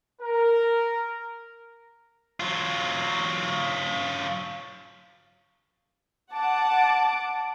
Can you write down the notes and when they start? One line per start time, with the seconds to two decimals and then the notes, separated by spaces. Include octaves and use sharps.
0.22 A#4
2.40 F#3 F4
6.33 F#5 A5 D6